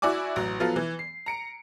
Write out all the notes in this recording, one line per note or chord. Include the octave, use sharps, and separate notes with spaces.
E4 F#4 D5 G#5 D6
A1 F#3
F3 F#3 B3 F4 A4
E3
C7
A#5 C#7 D7